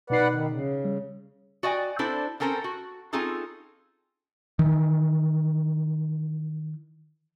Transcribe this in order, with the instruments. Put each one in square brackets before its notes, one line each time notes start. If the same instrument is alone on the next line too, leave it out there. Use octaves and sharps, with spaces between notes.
[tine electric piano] B2 D#4 C7 [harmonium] B4 D5 F#5
[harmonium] D#3
C#3
[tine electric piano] G3
[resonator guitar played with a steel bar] F#4 D5 D#5 G5 G#5
C4 D4 E4 A4 C5 D5
C4 C#4 A4 A#4 C5
F#4
C4 C#4 D#4 F4 G#4 A4
[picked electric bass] D#3 E3